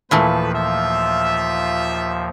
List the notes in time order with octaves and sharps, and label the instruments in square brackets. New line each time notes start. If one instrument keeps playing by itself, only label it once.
[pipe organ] D#2 F3 [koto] A#2 E3 A3 [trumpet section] A4 B4
[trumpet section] F4 E5